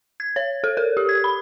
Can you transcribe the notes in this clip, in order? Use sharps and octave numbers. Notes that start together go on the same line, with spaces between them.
G#6
C#5
A4
A#4
G4
G#6
B5